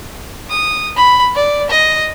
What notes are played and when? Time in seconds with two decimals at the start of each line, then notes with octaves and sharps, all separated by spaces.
0.49 D#6
0.96 B5
1.35 D5
1.70 D#5